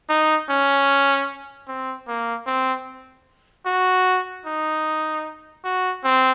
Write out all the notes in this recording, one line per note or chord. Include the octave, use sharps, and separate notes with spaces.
D#4
C#4
C4
A#3
C4
F#4
D#4
F#4
C4